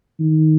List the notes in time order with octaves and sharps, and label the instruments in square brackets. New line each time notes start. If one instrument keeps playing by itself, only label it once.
[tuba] D#3